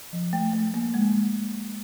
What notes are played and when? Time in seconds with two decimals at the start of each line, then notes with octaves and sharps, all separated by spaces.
0.13 F3
0.33 A3
0.53 A3
0.74 A#3
0.94 G#3